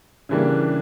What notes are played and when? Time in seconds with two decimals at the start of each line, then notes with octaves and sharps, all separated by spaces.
0.29 C#3 E3 G3 A#3 D4